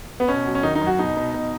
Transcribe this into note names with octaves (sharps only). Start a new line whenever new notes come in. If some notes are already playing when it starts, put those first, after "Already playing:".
B3
B2 C#4
F#3
C#4
D#3 D#4
D#4
F#2
F#4
B2 D#4
B2
B2